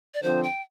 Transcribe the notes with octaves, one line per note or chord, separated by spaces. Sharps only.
D5
D3 F3 C4 C5
G5